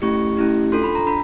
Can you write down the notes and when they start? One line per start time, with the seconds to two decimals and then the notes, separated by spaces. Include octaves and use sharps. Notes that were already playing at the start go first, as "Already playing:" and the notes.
0.02 A3 C#4 E4 G4 C#6
0.37 A3 C#4 E4 G4
0.72 D4 F4 A4 C6
0.84 B5
0.95 A#5
1.07 D4 B5